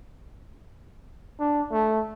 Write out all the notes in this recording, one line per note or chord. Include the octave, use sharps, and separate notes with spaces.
D4
A3